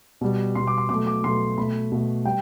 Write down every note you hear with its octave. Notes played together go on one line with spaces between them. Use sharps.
B2 G3
B2 G3 C6
D6
C6
B2 F#3 A3 D6
D6
B2 F#3 A3 C6
B2 A3 B5
B2 A3
G3 G5